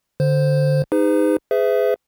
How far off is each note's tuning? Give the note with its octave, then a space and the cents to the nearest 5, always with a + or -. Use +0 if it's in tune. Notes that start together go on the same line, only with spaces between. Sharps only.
D3 +0 C5 +0
D#4 +0 G#4 -40 B4 +45
G#4 +0 B4 +45 E5 +0